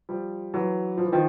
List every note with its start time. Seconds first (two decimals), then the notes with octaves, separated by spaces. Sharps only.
0.09 F3 G3
0.54 E3 F#3
0.97 F3
1.05 E3
1.12 D#3 F3